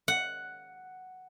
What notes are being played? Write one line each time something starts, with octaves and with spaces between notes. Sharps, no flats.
F#5